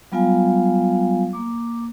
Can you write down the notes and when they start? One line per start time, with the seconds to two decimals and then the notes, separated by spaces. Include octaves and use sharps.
0.12 F#3 G3 B3 F4 F5 G#5
1.33 A#3 D6